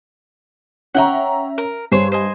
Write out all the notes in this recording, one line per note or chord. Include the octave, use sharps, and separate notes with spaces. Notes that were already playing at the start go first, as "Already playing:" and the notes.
C#4 E5 F#5 G5 A#5 C#6
A#4
G2 G#4 C5 C#5
C5 D#5 G#5